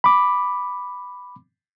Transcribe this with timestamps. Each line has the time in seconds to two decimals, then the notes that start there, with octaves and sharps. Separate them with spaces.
0.04 B5 D6